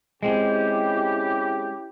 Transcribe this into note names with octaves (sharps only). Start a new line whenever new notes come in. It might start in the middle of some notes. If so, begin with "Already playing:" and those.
G#3 C4 C#4 E4 G4